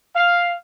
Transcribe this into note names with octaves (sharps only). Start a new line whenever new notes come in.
F5